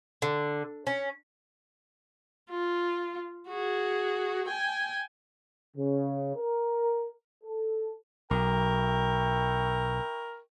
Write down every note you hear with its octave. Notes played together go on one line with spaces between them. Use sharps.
D3
C#4
F4
F#4 G#4
G5 G#5
C#3
A#4
A4
B1 E4 A#4 G5 C#6